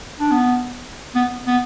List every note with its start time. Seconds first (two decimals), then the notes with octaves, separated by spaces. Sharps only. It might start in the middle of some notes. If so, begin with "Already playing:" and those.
0.20 D4
0.31 B3
1.15 B3
1.47 B3